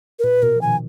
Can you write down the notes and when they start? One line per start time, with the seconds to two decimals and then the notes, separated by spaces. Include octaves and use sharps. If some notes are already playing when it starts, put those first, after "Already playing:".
0.19 A#4
0.24 A#2 B4
0.43 B2 A#4
0.56 F3
0.61 D#3 G#5